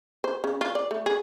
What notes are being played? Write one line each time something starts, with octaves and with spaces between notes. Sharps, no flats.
C5
C#3
F4
D5
A3
G#4